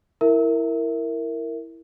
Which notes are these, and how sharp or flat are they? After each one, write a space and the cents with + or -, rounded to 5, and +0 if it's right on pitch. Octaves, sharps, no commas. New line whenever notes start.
E4 +0 A#4 -10 E5 +0